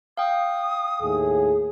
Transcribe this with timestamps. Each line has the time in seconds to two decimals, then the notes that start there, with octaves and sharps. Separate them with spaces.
0.17 F5 G5 D#6
1.02 D#2 A2 G#4